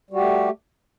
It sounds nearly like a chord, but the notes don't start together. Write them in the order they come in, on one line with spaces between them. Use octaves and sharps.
G3 F#4 G4 A3